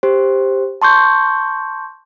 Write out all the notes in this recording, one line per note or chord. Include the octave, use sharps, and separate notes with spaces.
G4 C5
A5 C6 C#6 G6